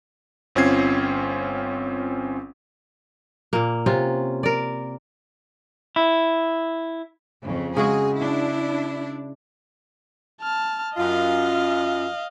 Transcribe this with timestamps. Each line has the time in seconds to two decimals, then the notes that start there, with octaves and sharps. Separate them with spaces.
0.55 G1 C4 C#4 F4 G#6 C7
3.53 A#2 A#3
3.86 C3 C#4 F4
4.43 A#4 D5
5.96 E4
7.43 F2 C#3
7.77 C#3 G#3 F#4 G#4
8.17 D4 E4
10.41 A5 F6
10.97 F#2 F4 D#5 F5